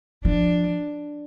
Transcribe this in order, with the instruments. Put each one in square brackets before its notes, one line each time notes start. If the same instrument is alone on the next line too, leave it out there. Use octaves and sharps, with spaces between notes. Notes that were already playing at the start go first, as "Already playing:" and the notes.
[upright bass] F3 [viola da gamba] D4